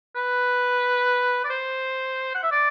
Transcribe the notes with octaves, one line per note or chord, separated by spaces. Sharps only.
B4
D5
C5
F#5
E5
D5